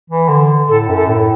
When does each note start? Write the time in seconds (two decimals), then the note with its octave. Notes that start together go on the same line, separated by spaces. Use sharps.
0.10 E3
0.29 D3
0.68 A2 A4
0.89 F#2
0.95 A4
1.09 A2